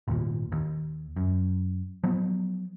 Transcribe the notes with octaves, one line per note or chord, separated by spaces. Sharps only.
G#1 D#2 A#2
D#2
F#2
F3 F#3 B3